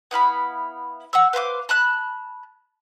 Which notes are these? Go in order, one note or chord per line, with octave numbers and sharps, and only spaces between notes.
B3 E4 F5 B5
F#5 C#6 E6
B4 C5 F5 D6
A5 B5 F#6